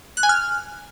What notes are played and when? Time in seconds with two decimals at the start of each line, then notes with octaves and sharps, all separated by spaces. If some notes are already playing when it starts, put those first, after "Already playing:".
0.17 F#6
0.23 G#5
0.29 F6